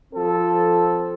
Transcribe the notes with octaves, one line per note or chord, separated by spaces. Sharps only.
F3 C4 A4